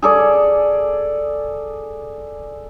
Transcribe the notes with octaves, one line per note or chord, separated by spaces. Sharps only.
G#4 A4 D5